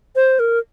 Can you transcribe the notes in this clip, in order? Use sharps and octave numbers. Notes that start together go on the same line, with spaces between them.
C5
A#4